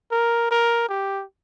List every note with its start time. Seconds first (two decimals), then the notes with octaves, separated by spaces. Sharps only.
0.12 A#4
0.51 A#4
0.89 G4